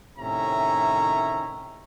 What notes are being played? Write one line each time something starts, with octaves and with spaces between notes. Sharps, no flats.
A2 C3 D#3 C#4 E5 A#5